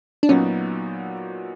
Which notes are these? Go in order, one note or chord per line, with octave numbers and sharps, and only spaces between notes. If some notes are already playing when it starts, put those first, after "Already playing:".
D4
A#2 F#3 B3 C#4 D#4 F#4